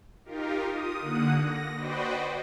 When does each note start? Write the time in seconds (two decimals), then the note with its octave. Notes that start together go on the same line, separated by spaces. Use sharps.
0.25 D#4 F4 G4 A#4
0.67 D#6
1.01 D3 A#3 F#5 D#6
1.37 A#6
1.75 F#4 B4 C5 D5 D#5 G5